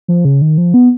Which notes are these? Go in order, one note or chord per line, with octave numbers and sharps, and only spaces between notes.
F3
C#3
D#3
F3
B3